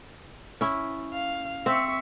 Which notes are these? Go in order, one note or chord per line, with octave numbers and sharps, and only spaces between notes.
C#4 E4
F5
C4 E5 C#6